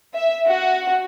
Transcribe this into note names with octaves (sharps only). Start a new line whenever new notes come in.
E5
F#4